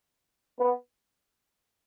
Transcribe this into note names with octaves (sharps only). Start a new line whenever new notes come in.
B3